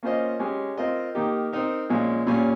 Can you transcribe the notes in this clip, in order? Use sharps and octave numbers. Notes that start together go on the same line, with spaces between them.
A#3 C#4 F4 C5 D#5
G#3 C#4 G4
C4 F4 A#4 D#5
D#3 A#3 D#4 G4
C4 D#4 A#4
A#2 F3 G#3 C#4
A#2 G3 C#4